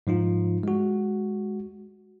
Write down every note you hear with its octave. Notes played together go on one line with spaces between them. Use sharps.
G#2 F3 D#4 F4
G#3 F#4